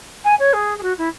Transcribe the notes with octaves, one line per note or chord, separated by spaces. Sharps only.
G#5
C#5
G#4
G#4
F#4
E4